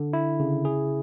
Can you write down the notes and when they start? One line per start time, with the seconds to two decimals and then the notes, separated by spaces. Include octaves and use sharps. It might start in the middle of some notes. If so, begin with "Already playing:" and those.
Already playing: D3
0.13 E4
0.40 C#3
0.65 G#4